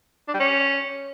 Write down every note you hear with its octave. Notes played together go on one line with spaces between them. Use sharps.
D4
G3
C#4